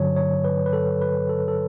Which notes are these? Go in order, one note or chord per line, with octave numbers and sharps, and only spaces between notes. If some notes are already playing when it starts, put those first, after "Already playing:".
Already playing: G2 D3 F#3 C#5
C#5
B4
B4
A4
B4
A4
A4